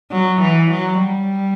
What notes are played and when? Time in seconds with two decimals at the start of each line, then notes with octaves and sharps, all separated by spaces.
0.12 F#3
0.41 E3
0.71 F#3
1.00 G3